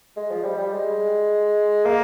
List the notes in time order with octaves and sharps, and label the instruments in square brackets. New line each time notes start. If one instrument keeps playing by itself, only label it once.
[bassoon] G#3
F3
G3
G3
G#3
A#3